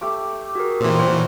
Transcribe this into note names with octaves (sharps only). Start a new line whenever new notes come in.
A3 G4 D6
F#4 G#4 A#4
A#2 E3 C4 C6
F#4 C5 C#5